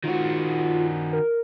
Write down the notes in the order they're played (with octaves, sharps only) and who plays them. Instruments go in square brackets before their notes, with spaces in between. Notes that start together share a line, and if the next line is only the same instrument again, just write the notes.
[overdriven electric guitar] D#3 F#4 [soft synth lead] F4
[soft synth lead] A#4